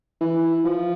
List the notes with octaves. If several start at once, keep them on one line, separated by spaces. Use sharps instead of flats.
E3
F3